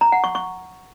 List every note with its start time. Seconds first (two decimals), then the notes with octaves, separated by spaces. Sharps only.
0.01 A#5
0.12 F#5
0.24 C#6
0.35 C#6